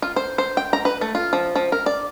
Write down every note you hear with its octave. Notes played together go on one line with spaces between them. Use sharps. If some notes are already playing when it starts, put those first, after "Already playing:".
F4
C5
C5
G5
A#5
B4
A3
F4
F3
F3
A#4
D5